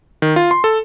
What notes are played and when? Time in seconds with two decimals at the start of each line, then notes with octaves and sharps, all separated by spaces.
0.22 D#3
0.36 F4
0.51 C6
0.64 A4